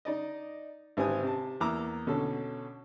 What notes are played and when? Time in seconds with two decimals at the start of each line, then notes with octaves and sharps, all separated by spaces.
0.05 D#4 D5 D#5
0.97 G#1 C4 G4 B4 G#5 D#6
1.23 C3 A5
1.60 E2 A#3 A#5 D6 E6
2.07 B2 D3 C#4 A4